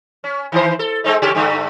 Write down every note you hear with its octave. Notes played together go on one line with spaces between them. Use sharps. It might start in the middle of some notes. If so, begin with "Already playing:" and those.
C#4
D#3 E3 C5
A4
G#3 C4 D#4
C#3 C#4 G4
G2 D3 A3